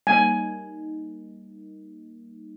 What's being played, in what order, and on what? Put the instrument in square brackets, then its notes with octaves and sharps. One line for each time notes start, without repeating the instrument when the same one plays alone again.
[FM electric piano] G3 A#3 D#4 [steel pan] G#5